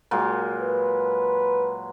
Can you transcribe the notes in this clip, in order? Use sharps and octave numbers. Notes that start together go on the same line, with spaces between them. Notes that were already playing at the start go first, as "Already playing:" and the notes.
A#2 F#3 G#3
B4